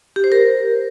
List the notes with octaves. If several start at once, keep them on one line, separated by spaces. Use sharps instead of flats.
G4
C5
A#4